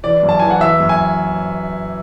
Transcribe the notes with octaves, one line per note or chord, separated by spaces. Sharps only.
E3 D5
F#2
A5
E3 G#5
F#5
E3 E5
F#2
G#5